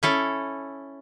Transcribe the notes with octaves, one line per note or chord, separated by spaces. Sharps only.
C#4 E4 A4